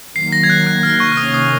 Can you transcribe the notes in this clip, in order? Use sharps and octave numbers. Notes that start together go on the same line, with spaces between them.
D#3 F#3 A#3 C7
A#6
G#6
F#6
F#6
F6
C#6
F6
C3 D#3 A#3 C#4 D#6
D#6